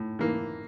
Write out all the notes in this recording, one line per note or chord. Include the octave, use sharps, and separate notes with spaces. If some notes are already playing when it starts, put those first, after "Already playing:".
Already playing: A2
E3 A#3